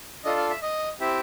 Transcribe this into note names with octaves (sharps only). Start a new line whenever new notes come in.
D4 F4 A4 D#5
F5
E5
D#5
C4 E4 G4 E5